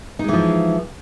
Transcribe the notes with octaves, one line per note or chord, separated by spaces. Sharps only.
E3 F3 G#3 D#4